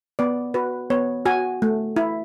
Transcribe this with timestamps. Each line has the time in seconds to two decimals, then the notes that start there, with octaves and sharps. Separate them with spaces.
0.19 B3 D5
0.54 F#4 B4
0.90 B3 C#5
1.25 F#4 G#5
1.62 A3
1.96 E4